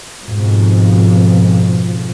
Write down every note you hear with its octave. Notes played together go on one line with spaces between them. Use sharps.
F2 G#2 B2 F3